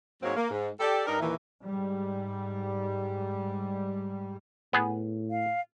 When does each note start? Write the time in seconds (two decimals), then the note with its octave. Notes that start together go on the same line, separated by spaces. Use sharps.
0.23 G#2 F#3 G#3 A#3 C4 C#5
0.36 A#3
0.50 G#2
0.80 G4 A4 D5
1.06 G2 D4 D#4 A#4
1.19 D#2 A#2 D#3 E3
1.65 G#2 G3
4.73 A2 B3 G#4
5.30 F5